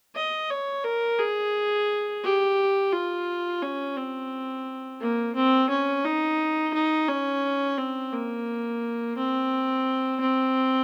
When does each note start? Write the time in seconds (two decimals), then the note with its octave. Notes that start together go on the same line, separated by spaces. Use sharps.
0.15 D#5
0.50 C#5
0.84 A#4
1.19 G#4
2.23 G4
2.92 F4
3.62 C#4
3.97 C4
5.01 A#3
5.35 C4
5.70 C#4
6.05 D#4
6.74 D#4
7.09 C#4
7.78 C4
8.13 A#3
9.17 C4
10.20 C4